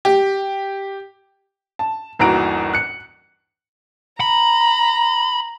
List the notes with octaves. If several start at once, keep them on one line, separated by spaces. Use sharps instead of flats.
G4
A5
G1 D#2 E3 F#4 A#5 D7
F#6 C#7
A#5 B5